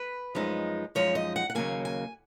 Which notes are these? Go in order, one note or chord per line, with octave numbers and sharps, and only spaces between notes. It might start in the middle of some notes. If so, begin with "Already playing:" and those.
Already playing: B4
F#2 F3 G#3 D#4
F#2 F3 G#3 D#4 C#5
D#5
F#5
F#5
D#2 C#3 F#3 A#3 G#5
G#5